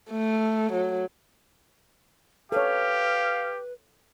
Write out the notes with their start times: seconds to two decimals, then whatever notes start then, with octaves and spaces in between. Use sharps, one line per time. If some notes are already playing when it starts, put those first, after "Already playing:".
0.11 A3
0.73 F#3
2.52 G4 A4 B4 C#5 F5